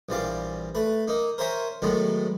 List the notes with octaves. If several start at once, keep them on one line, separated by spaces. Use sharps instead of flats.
A#1 E3 G3 F5 D6
A3 B4
A#3 D#4
A#4 C5 C#5 E5 G#5 A#5
A2 D#3 F#3 G#3 B3